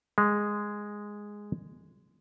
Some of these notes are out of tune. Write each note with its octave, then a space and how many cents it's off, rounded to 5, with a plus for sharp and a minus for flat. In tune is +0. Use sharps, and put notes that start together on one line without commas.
G#3 -5